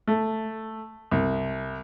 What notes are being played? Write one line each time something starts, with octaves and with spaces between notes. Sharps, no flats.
A3
C2